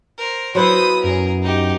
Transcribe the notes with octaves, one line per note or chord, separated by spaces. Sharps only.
A#4 C5
F#3 B3 E4 C5 B5 D#6
F#2 G#4 A#4
D#4 G4